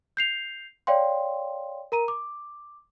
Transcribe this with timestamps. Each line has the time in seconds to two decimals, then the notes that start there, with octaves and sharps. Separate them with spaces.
0.17 G6 C7 F7
0.87 C#5 D5 F5 G5 C6
1.92 A#4 A#5 D#7
2.08 D6